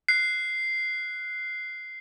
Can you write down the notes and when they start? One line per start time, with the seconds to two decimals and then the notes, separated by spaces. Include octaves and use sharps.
0.08 F#6 C7